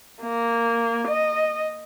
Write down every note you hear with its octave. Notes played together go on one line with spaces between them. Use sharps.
A#3
D#5